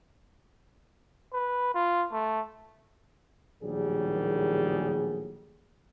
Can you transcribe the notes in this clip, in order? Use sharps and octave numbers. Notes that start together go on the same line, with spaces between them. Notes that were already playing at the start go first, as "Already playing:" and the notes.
B4
F4
A3
A#1 D#2 A2 F#3 G3 G#4